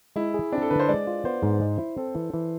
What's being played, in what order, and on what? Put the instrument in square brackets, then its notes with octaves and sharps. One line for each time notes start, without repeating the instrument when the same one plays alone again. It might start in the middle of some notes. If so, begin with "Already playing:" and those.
[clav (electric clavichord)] G#3 [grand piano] E4
[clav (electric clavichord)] G#4
[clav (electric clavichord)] C4 [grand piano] D4
[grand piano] A4
[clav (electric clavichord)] D3 [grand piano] B4
[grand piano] C5
[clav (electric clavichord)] G#3 [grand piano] D5
[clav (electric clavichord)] F4
[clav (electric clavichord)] B3 [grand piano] C5
[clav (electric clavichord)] G#2
G#3
E4
[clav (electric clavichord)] C4 [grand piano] A4
[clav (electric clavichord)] E3
E3